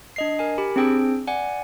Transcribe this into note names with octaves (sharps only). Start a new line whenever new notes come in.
D4 D#5 C7
A#4 G#5
G4 B5
C4 D4 G#4 G5 E6
D5 F#5 G#5